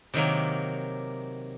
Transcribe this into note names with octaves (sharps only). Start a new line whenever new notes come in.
C3 D#3 F#3 A#3